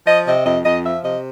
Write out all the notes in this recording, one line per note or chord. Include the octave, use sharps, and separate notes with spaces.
F3 D#5
C3 D#5
F2 D#5
F2 D#5
F3 E5
C3 D#5